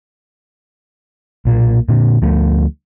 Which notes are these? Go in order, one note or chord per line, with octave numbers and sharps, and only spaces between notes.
B1 A#2 A#3
A#2 D3
D2 F3 A3